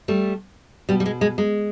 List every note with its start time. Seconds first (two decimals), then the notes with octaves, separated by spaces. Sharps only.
0.08 G3 A3
0.89 B2 G3
1.00 G3
1.06 G#3
1.21 G#3
1.38 G#3